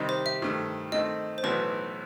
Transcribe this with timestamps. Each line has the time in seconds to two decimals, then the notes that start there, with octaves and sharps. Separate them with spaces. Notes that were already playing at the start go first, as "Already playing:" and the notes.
Already playing: C3 D#3 G3 D#4
0.09 C5
0.26 E5
0.42 G2 D#3 A3
0.92 D#3 A3 C4 D#5
1.38 C5
1.44 B1 A2 E3 B3 F#4 B4